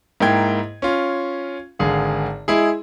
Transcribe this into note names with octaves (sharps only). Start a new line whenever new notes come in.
G#2 A#3 E4 G5 G#6
C#4 F4
G#1 D3 G#4 F5
G#3 E4 G#4